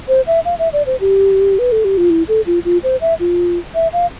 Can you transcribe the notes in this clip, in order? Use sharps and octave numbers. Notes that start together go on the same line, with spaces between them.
C5
E5
F5
E5
D5
C5
G4
B4
A4
G4
F4
E4
A4
F4
F4
C5
E5
F4
E5
F5